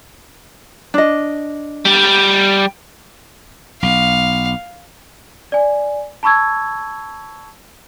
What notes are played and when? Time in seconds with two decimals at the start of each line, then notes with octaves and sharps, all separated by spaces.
0.94 D4 D#5
1.85 G3
3.82 B1 F5
5.52 D5 G#5
6.23 A5 B5 C#6 E6 G#6